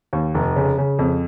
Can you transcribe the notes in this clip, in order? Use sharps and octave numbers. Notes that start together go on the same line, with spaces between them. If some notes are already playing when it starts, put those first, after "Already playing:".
D#2
F1
C#3
C#3
F2